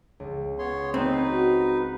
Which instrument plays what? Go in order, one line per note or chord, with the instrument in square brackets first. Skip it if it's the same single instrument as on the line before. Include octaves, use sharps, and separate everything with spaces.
[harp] C#2
[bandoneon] B3 C#5 C6
[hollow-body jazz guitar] C4 [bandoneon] D#4 B4
[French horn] F#4